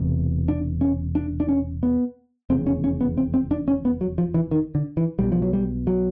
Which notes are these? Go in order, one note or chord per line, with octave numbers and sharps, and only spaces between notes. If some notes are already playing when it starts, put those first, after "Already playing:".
Already playing: E1 E2 C3
D4
C#4
D4
D4
C#4
B3
F1 E2 C#3 C4
C#4
C#4
B3
C4
C4
D4
C#4
B3
F#3
F3
E3
D#3
D3
E3
B1 B2 G3
F3
F#3
G3
F#3